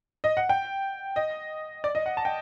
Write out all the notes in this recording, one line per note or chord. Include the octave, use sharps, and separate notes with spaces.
D#5
F#5
G5
D#5
D5
D#5
F#5
A5
G5